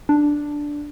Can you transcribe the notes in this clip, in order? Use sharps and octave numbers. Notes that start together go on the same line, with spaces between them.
D4